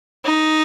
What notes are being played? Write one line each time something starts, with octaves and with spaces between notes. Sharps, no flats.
D#4